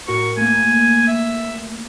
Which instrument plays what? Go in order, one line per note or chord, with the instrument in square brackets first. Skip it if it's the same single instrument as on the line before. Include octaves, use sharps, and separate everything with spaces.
[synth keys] A2 F#4 A#4 [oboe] C#6
[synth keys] A3 A#3 [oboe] G#5
[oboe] E5